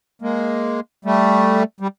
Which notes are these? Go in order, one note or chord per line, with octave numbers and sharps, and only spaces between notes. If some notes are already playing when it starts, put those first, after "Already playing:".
G#3 A#3
G3 A3
G3